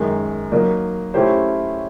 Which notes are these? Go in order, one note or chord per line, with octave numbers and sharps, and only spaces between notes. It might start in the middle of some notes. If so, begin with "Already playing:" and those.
Already playing: F#2 D#3 G#3
F#3 A#3 D#4
A3 C#4 E4 G4 C5